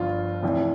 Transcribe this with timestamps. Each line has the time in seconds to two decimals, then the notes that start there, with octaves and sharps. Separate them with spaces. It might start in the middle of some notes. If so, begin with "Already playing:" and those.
Already playing: G1 G2 F3 F4
0.43 F1 F2 E3